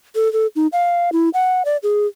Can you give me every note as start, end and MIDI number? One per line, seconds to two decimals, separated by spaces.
0.15 0.31 69
0.33 0.47 69
0.56 0.67 63
0.73 1.10 77
1.13 1.29 64
1.34 1.63 78
1.65 1.77 74
1.83 2.07 68